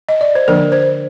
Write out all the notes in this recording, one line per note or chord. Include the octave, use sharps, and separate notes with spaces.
D#5
D5
C5
D3 F3 A#3 D4 A#4
C5